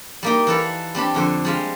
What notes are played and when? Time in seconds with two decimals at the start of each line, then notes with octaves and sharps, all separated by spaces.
0.23 G3 A#3 D#4
0.47 E3 E4 A4 F5
0.95 G3 C4 D4 B5
1.14 F2 D3 C5
1.45 G3 G#3 F5